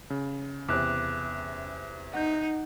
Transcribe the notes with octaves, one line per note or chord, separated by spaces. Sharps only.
C#3
E2 C3 D6 F#6
D#4 F#5 G6